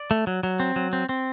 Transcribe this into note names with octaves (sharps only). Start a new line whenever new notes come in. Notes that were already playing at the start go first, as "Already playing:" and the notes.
Already playing: D5
A3
F#3
F#3
C4
F#3
C4
C4